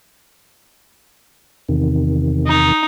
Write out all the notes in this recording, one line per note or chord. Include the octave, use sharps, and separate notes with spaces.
E2 C3 D#3
D#4